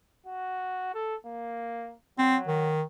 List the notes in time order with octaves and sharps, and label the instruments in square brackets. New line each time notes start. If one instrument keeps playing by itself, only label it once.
[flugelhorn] F#4
A4
A#3
[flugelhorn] F#3 [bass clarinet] C4
[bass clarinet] D#3